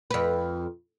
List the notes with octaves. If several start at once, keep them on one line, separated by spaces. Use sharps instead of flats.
F2 B4